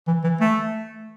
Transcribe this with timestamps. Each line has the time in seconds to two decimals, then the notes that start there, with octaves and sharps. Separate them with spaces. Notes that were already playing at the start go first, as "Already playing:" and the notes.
0.08 E3
0.23 E3
0.41 A3